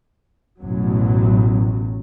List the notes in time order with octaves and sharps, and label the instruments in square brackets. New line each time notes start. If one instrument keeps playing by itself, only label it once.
[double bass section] A1 F#2 B2 F#3